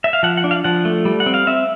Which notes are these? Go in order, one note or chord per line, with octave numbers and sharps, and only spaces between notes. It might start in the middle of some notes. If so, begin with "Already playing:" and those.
E5
F5
F3 F#5
F#5
D4
F5
F3 F#5
A3
G3
F#5
C4
F5
C4 E5